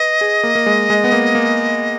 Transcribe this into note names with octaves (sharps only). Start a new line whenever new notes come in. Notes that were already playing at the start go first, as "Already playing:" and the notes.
Already playing: B4 D#5
G#4
A#3
A#3
G#3
G#3
B3
A#3
A#3